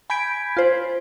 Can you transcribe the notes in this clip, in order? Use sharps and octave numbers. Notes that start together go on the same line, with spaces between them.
G#5 B5 G6 G#6 B6 D7
F4 C5